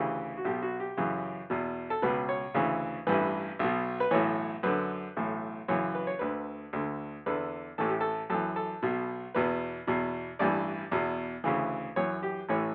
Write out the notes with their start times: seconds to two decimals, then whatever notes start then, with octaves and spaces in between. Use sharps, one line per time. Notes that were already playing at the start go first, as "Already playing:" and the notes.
Already playing: D2 C#3 E3 G4
0.37 F#4
0.45 B1 B2 G4
0.62 F#4
0.80 G4
0.97 F#2 C#3 E3
1.50 E2 B2
1.90 A4
2.02 C#2 B2 B4
2.29 C#5
2.54 D2 C#3 E3
3.07 A1 G2 E3 B4
3.59 B1 B2
4.00 B4
4.11 B1 A2 E3 C#5
4.63 F#2 D3 B4
5.17 B1 A2 E3
5.68 F#2 C#3 E3 C#5
5.95 B4
6.07 C#5
6.19 D2 D3 B4
6.73 D2 D3
7.26 E2 D3 B4
7.78 A1 A2 E3 A4
7.89 G4
8.01 A4
8.30 F#2 E3 A4
8.56 A4
8.82 B1 B2
9.34 E2 B2 B4
9.87 E2 B2
10.39 A1 G2 E3 D5
10.92 E2 B2
11.44 D2 C#3 E3
11.96 F#2 E3 C#5
12.23 G4
12.49 A1 A2 E3 C#5